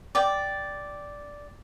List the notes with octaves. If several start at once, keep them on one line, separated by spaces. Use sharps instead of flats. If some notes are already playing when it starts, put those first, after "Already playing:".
D5 G5